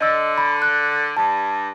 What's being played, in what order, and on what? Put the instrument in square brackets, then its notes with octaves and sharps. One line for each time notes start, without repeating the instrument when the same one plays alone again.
[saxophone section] D3 [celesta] D#5 E6
[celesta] B5
F#6
[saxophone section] G2 [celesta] A5